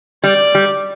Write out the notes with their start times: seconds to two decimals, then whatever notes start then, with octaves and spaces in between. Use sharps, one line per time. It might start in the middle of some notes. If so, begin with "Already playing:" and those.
0.23 G3 D5
0.55 G3